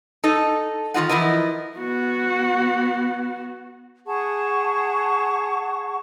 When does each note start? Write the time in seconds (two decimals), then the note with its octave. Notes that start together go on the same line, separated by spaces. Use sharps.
0.24 D#4 A4 D#5
0.94 D#3 F3 F4 D#5 F#5
1.09 E3 F3 E4 A#4 D#5
1.77 B3 F#4
4.06 G#4 F#5 A5 C#6